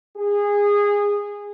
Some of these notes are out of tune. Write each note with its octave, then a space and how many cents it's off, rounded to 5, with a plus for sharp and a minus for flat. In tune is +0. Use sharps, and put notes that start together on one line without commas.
G#4 -20